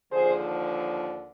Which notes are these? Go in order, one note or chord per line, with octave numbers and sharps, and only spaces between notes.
D#2 D3 F3 G#4 C5